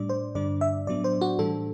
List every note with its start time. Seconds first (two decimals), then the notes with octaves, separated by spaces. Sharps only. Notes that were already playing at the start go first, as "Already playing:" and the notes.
Already playing: A2 G3 D4 D5
0.09 C5
0.35 G2 D3 G3 D4 D5
0.61 E5
0.87 A2 F#3 B3 D4 D5
1.04 C5
1.21 F#4
1.39 A2 E3 G3 D4 A4